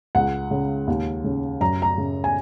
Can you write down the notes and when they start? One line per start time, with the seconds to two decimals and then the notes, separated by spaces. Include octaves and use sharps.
0.15 C#2 F#5
0.51 C#3
0.87 D#2
1.24 C#3
1.61 F#2 A#5
1.82 A#5
1.98 C#3
2.24 G#5